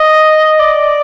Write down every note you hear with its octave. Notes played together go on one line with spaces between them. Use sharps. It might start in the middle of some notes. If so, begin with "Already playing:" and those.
Already playing: D#5
D5